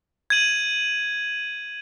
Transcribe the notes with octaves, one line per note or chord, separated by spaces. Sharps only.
G#6 D#7 F#7